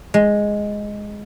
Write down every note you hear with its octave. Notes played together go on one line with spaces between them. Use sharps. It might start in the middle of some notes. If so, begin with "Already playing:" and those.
G#3